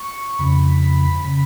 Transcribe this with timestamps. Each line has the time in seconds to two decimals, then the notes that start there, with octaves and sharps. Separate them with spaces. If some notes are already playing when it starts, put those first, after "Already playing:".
Already playing: C#6
0.39 F2 C#3 B5
1.24 C#3 B5